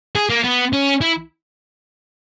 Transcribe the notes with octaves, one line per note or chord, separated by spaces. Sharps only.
G#4
A#3
B3
C#4
E4